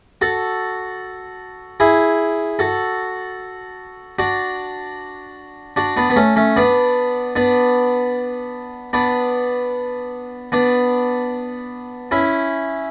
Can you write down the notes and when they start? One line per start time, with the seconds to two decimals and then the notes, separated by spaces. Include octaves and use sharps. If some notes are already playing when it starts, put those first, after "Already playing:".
0.21 F#4 A4
1.80 E4 G#4
2.59 F#4 A4
4.19 D4 F#4
5.76 D4 F#4
5.97 B3 D4
6.10 B3
6.16 A3 C#4
6.36 A3 C#4
6.56 B3 D4
7.36 B3 D4
8.93 B3 D4
10.52 B3 D4
12.11 C#4 E4